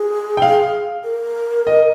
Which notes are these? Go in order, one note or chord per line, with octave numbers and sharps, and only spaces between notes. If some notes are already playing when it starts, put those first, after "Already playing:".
Already playing: G#4
G5
F5
A#4
D#5